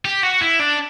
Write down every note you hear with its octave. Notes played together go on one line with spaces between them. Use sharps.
G4
F#4
E4
D4